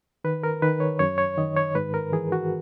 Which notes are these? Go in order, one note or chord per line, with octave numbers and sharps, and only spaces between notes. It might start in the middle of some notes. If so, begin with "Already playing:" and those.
D#3 B4
A#4
D#3 B4
C#5
F#2 C#5
C#5
D#3 D#5
C#5
G#2 B4
A#4
E3 G#4
F#4